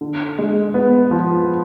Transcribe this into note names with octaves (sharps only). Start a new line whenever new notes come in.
D3
G#3
B3
F3